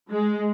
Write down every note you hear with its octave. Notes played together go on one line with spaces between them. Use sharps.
G#3